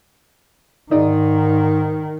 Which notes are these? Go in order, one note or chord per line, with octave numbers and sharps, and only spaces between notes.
G#2 D#3 D#4 D5